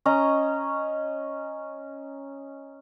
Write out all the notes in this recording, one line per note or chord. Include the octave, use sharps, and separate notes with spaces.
C#4 D#5 A#5